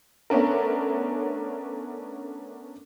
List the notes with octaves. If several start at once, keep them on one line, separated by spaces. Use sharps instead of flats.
A3 B3 C#4 D4 A#4